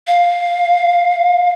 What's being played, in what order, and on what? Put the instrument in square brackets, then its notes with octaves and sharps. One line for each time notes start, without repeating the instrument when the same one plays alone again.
[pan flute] F5